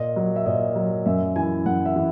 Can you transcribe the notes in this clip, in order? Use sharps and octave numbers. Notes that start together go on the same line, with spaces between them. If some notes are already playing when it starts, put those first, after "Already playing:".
Already playing: A#2 D#5
F#3
E5
A#2 D#5
F#3
F#2 E5
E3 G#5
F#2 F#5
E5
E3